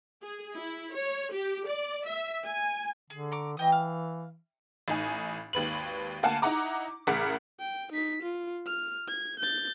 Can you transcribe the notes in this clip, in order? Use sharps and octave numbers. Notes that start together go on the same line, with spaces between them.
G#4
E4
C#5
G4
D5
E5
G#5
D3 G#4
A#5 C#6 D6
E3 D#5 G5 D#6
F5
A1 D#4 G#5
G#1 D#2 B4 F#7
D2 A#3 F5 F#5 G#5 A5
D#4 E4 F#5 A#5 D6
A1 C#3 A#4 F#5 D6 B6
G5
D#4 B6
F4
F6
G#6
G6 A6